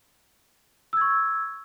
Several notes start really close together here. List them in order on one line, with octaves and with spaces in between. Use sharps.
E6 G#6 C#6